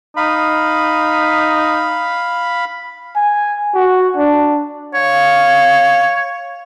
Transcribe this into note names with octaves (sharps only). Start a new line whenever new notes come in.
D#4 F5 B5
G#5
F#4
D4
C#5 F5